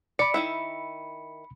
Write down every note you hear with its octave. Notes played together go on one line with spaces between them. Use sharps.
D5 B5 C#7
D#3 E4 E5